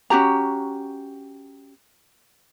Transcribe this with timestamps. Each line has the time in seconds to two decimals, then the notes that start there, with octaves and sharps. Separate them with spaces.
0.10 C#4 F#4 G4 A#5